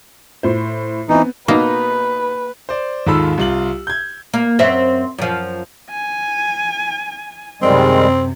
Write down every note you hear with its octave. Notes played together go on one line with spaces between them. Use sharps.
A2 C5
E3 B3 C4 D#4
B2 A#3 D#4 B4
C5 D5
D#2 G#2 F4 A4 B5 E6
C2 F4 F#7
G6 G#6
A#3
F#2 C4 E5
F#2 F3
G#5
F#2 C3 D#3 G3 G#3 C4